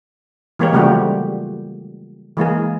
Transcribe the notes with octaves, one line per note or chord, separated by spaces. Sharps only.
E3 G#3 A#3 G4 C#5
C#3 F3 G3 A3 F#4 G4
E3 G#3 A#3 G#4